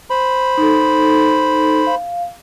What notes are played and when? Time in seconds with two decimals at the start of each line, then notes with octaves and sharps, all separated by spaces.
0.10 C5 B5
0.58 D#4 A4
1.87 F5